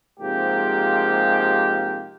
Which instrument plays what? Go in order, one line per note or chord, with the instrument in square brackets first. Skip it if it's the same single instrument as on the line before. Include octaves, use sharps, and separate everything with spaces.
[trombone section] G#2 C3 F3 G#3 A#3 G4